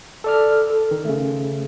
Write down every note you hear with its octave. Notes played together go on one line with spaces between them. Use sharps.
A4 D5 F6
A4
D#3
C#3 A3